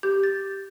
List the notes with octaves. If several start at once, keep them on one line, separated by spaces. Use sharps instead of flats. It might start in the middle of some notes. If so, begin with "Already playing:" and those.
G4 G6
A6